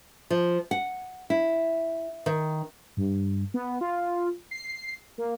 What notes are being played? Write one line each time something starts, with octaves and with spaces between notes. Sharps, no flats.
F3
F#5
E4
D#3
G2
B3
F4
C7
A#3